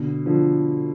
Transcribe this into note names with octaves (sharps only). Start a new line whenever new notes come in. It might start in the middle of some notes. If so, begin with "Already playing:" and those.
Already playing: B2 D3
D3 F3